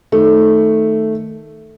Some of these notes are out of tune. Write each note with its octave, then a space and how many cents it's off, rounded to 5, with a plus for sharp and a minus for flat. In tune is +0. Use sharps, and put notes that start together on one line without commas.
D#3 +0 A3 +0